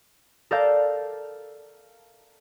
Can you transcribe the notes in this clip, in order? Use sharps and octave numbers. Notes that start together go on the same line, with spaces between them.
A4 A#4 D5 F5 A5 G6